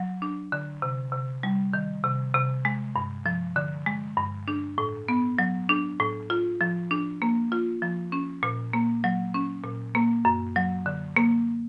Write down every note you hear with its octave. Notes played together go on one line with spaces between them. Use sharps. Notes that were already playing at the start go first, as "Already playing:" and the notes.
Already playing: F#3
D4
D3
C3
C3
G3
D#3
C3
C3
G#3
G2
F3
D3
G#3
G2
D4
A2
B3
F#3
D4
A2
F4
F3
D4
A#3
F4
F3
C#4
A#2
A#3
F#3
C#4
A#2
A#3
F#2
F#3
D3
A#3